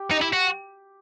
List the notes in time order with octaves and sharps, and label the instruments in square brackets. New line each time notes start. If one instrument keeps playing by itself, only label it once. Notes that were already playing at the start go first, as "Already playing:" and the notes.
Already playing: [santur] G4
[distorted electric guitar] D#4
E4
F#4